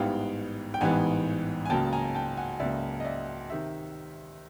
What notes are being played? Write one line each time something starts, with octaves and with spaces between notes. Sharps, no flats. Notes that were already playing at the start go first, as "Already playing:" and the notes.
Already playing: A1 G#2 E3 G3 B3 F5 G5
G5
A1 G#2 E3 G3 B3 F#5 G#5
G#5
C#2 C#3 F#3 A#3 G5 A5
G#5 A#5
G5 A5
F#5 G#5
C#2 C#3 F#3 A#3 D5 E5
D#5
D5 E5
C3 D#3 E5